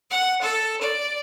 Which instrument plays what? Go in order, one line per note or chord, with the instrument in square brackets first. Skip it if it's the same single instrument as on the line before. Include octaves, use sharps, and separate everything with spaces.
[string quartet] F#5
A4
D5